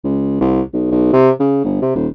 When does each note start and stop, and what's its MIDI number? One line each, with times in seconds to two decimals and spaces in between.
0.04 0.38 37
0.41 0.61 36
0.73 0.87 35
0.91 1.10 35
1.13 1.30 48
1.40 1.62 49
1.64 1.79 31
1.82 1.94 48
1.95 2.07 27